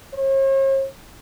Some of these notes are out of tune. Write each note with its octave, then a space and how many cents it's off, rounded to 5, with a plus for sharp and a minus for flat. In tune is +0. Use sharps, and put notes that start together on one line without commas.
C#5 -45